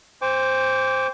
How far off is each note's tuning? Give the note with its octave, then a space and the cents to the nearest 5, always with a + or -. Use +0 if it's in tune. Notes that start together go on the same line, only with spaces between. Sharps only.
C5 +0 G5 +40 D6 -25